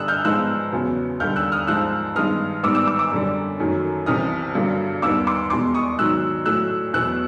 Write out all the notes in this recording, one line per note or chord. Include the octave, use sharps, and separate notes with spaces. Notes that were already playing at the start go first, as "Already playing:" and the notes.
Already playing: G2 D3 G3 D#6 E6 F#6
F6 G6
G#2 F3 G#3 B3 E6 F#6
E2 C#3 F#3 B3
D#2 D3 G3 F6 G6
E6 F#6
D#6 F6
G#2 F3 G#3 E6 F#6
G2 D#3 G#3 B3 D#6 F6
G#2 D#3 G3 B3 D6 E6
D6 E6
D6 E6
D6 E6
F#2 D3 G3
F#2 D#3 F#3 A3
C2 C3 E3 D#6 F6
G2 D3 F#3 A#3
D#2 D#3 G3 B3 D6 E6
C6 D6
E2 B2 G#3 C6 D6
C#6 D#6
G#2 D#3 F#3 E6 F#6
A2 F#3 A3 E6 F#6
E2 B2 F#3 B3 E6 F#6